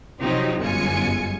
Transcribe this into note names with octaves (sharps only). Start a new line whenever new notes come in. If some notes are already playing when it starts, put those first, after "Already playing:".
C3 F3 F#3 C4 D#4 G4
G1 F#2 G#3 F4 G#5 C#7